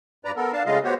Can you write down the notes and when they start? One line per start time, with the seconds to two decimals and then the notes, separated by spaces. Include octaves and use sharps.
0.25 G2 B4 D5 A#5
0.36 B3 A4 A#4
0.53 D4 F5 A5
0.66 C#3 G#3 A3 F4 D#5 F5
0.84 B3 F#4 G4 C5 C#5